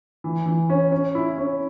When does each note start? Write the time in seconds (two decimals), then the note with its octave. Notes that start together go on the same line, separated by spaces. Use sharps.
0.24 E3
0.46 E3
0.69 C#4
0.92 C#4
1.15 E4
1.38 C#4